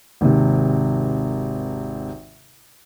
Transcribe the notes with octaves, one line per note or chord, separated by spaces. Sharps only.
G#1 D#2 C3